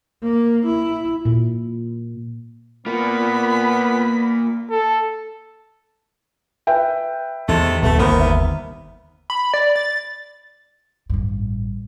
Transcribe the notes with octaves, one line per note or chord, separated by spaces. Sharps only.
A#3
E4
A#2
A#3 B3 F4 B5
A4
B4 E5 G5
E2 C3 D#3 G#3 A3
D#1 C2 A3 B3
G1 D#2 C3 D#3 A#3 B3 C5
E5
B5
D5
A6
A1 G2